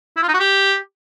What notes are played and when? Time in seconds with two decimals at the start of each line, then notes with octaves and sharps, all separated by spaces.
0.17 E4
0.22 F4
0.28 D#4
0.34 F#4
0.40 G4